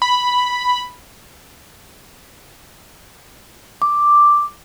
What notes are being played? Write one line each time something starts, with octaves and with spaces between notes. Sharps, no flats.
B5
D6